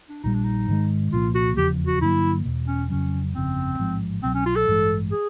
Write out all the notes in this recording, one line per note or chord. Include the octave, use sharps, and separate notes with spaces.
D4
A#1 A#2 G3 D#4
D4
D#4
G#2 D#3 G#3
C2 A#2 F3 A#3 F4
F#4
F1 E2 C#3 F3 G4
F#4
G2 D3 F#3 A#3 E4
E1 E2 B2
C#4
F2 C#3 F#3 C#4
G1 F2 C#3 C4
A1 G#2 F3 G#3
C2 B2 F#3 C4
C#4
F4
A4
A1 G2 E3 G#3
G#4